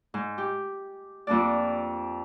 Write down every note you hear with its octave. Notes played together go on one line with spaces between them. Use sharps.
G#2
G4
F2 A#3 D4 D5